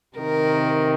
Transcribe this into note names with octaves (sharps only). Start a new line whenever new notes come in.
C3 D#3 A#4